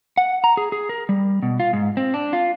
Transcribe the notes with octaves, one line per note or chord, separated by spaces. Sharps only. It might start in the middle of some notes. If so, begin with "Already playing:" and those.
F#5
A#5
G#4
G#4
A#4
G3
B2
F4
G#2
C4
D4
F4